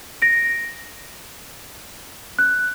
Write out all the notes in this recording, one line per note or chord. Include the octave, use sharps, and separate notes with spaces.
A#6 D7
F#6